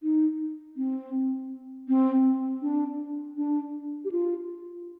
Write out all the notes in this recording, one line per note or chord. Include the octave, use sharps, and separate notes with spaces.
D#4
C4
C4
D4
D4
G4
F4